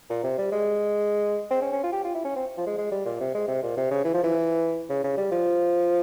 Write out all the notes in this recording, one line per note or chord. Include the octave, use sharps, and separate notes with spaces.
A#2
C3
G3
G#3
C4
C#4
C#4
F4
G4
F4
E4
C#4
C4
F3
G#3
G#3
G3
A#2
C3
G#3
C3
A#2
C3
C#3
E3
F3
E3
C#3
C#3
G3
F3